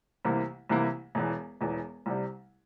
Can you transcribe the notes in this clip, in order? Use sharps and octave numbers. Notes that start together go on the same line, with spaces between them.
C2 C3 E3 A#3 E4
C2 C3 E3 A#3 E4
E1 E2 E3
E1 E2 E3
C2 C3 G3